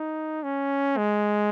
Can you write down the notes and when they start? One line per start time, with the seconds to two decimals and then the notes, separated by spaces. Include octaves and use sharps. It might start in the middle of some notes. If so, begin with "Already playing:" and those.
Already playing: D#4
0.43 C#4
0.97 G#3